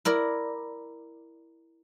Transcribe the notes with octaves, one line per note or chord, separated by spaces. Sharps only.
E4 A#4 D5